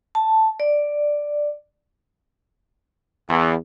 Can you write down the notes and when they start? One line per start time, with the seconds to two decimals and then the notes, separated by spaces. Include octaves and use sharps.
0.15 A5
0.60 D5
3.29 E2